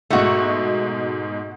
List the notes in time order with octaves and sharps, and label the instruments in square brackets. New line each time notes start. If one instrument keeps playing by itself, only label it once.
[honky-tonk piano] G#2 B2 D#4 [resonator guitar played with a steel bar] A3 F#4